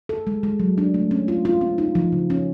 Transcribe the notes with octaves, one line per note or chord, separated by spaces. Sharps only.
A4
G#3
G#3
F#3
D4
A3
C#4
F4
F4
C4
D#4
F3
C#3
C#4